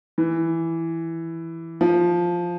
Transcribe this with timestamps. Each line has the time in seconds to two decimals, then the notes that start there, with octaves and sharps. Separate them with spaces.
0.18 E3
1.81 F3